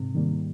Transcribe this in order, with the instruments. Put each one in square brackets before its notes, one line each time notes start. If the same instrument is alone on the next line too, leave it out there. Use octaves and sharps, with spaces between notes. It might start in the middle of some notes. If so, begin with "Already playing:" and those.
Already playing: [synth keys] G#2 [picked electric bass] C3
[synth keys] D#3 G3 A#3